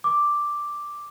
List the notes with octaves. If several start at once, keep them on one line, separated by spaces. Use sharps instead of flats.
D6